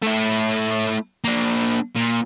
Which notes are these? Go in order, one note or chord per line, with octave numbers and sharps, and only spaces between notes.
A3 E4
A#3 D4
A#2